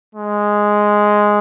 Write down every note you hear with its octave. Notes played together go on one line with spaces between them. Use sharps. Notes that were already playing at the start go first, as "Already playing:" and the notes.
G#3